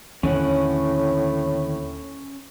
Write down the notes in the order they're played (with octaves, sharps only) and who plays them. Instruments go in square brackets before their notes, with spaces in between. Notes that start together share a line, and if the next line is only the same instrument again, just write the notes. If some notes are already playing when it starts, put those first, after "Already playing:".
[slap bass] D#2 D3 E3 [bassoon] A2 [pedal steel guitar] C#4 F#5